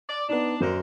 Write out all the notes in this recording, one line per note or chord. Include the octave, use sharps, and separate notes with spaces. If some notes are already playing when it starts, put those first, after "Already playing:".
D5
B3 D4 D#4
F#2 D3 A#4 C5